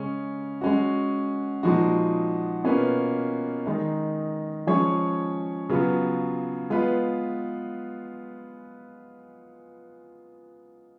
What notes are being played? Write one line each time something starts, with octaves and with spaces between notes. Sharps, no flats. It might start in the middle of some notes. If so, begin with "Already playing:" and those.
Already playing: C#3 G#3 C#4
G#3 C#4 F#4
A#2 F3 G#3 D#4 F#4
B2 A#3 C#4 F4 B4
D#3 G#3 D#4
F3 G#3 C#4 G#4 C#5
C#3 F#3 B3 F4
G#3 B3 F4 B4